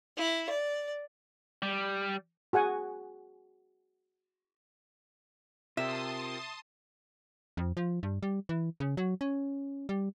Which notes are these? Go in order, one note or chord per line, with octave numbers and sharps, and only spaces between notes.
E4
D5
G3
F#4 G#4 F#5 G#5
C3 F4 A#4 E5 G5 A5 C6 D#6
F2
F3
G2
G3
E3
C#3
F#3
C#4
G3